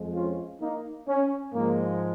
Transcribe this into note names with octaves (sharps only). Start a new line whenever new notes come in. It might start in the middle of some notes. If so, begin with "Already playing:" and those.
Already playing: F2 F3 G#3
C#4 F4
A#3 D#4
C#4
G#2 F3 G#3 A#3